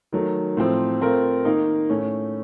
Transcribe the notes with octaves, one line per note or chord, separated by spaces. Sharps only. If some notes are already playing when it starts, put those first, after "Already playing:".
D#3 F#3 A3
A2 F3 C4
A3 C4 F4 A#4
D#3 A#3 D#4
A2 A3 C#4